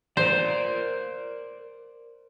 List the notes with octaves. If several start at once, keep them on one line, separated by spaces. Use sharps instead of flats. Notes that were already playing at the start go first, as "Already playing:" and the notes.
A#4 C5 D5